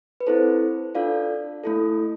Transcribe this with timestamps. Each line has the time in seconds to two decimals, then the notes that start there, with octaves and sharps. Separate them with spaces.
0.20 B4
0.27 C4 E4 A4 C5
0.95 D4 F4 A4 D5 F5
1.63 A3 E4 A4